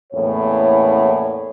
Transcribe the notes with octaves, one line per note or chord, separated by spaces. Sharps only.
E2 A2 A#3 C#4 C#5